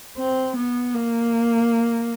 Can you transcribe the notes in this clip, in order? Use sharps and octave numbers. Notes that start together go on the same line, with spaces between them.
C4
B3
A#3